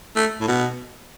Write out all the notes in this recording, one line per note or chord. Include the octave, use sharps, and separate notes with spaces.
A3
A2
B2